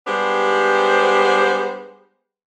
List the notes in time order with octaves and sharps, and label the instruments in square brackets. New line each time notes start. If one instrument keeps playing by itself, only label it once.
[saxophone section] G3 G#3 B3 D4 G4 C5